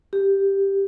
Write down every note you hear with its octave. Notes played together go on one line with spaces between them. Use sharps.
G4